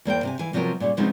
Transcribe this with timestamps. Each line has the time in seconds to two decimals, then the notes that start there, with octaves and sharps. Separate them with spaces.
0.05 E2 A#3 C5 G5
0.23 C3 G4 G#5
0.39 E3 F5 G#5
0.53 C3 F3 F#3 B3 F4 A#4
0.80 A#2 C#3 G3
0.97 C#3 F3 G#3 B3 C4 D#4